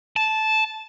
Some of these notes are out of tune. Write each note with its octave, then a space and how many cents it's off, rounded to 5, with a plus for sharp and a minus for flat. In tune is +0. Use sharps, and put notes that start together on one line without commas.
A5 -10